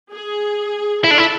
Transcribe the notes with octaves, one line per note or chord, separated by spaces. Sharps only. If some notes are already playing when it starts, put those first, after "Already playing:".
G#4
E4 A4
D4
E4